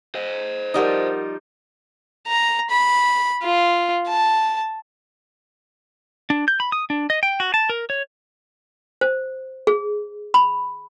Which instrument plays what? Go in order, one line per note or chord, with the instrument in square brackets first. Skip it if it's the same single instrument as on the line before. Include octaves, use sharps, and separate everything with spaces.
[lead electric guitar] C5 D#5
[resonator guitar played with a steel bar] F3 G3 D#4 [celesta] A#4 F#5 D#6
[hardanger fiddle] A#5
B5
F4
A5
[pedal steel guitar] D4
G6
B5
D#6
D4
D#5
G5
F#4
A5
A#4
C#5
[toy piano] C5
G#4
B5